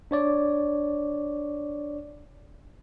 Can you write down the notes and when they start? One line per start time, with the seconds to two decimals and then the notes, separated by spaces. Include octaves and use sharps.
0.11 D4 C#5 D5